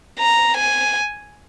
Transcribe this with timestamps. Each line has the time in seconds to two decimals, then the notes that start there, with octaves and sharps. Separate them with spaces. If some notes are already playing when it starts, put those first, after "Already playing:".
0.19 A#5
0.57 G#5